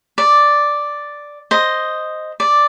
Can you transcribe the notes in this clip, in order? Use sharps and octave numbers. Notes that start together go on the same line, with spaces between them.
D5
C5 D#5
D5